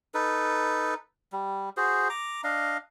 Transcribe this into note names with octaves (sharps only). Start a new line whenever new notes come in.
D#4 A4 B4
G3
F#4 G#4 C5
A#5 D6
D4 D#5 F5